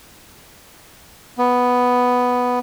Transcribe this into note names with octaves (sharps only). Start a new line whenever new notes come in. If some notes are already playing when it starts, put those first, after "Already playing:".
B3